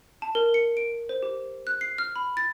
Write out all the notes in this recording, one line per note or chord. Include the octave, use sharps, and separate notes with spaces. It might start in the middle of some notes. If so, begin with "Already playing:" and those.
A5
A#4
C#7
D7
C5
G4
F#6
C7
F6
B5
A6